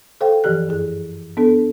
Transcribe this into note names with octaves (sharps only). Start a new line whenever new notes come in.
A4 C5 F5 G5
G2 E3 F3 G4 F#6
F#2 G#4
B3 D4 A4